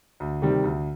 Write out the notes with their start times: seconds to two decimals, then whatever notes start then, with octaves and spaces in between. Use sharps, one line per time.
0.20 D2
0.42 C3 D#3 G3
0.64 D2